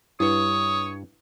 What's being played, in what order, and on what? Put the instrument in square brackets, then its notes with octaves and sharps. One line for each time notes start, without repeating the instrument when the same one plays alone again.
[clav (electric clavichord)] G2 [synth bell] E4 B4 [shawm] C#5 [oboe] D#6